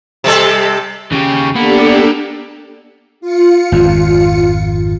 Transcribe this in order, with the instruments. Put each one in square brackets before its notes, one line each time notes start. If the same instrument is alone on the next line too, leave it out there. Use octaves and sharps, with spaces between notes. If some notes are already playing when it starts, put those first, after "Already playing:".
[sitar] C3 G3 A4
[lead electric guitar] D#2 G4 [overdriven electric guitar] C#3
[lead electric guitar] A#3 [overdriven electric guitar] B3 [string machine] D4 G4 A4
[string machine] F4 C#7
[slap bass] G#1 F2